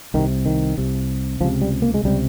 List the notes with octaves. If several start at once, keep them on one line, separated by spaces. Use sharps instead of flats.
C2 C3 D#3
D#3
C2 C3
C#2 C3 F3
G3
A#3
G#3
C#2 C3 G3